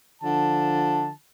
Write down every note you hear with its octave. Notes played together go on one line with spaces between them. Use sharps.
D3 F3 A5